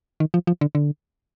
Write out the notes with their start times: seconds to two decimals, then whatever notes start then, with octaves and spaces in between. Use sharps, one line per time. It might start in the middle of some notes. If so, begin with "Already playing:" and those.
0.20 D#3
0.34 F3
0.47 F3
0.61 D3
0.75 D3